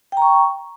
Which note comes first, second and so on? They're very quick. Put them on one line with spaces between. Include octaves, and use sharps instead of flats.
G5 A#5 C#6